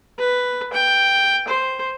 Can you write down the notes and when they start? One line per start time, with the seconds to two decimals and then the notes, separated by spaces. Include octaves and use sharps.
0.19 B4
0.73 G5
1.48 C5